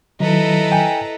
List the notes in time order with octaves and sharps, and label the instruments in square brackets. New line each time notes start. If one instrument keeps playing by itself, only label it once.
[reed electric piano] D#3 F#3 [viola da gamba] E4 A4 B4 [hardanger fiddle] D#5 A#5
[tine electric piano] G5 G#5